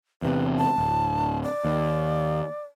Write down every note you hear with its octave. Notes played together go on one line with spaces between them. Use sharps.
E2 C3 B4
A5
D1
D5
D#2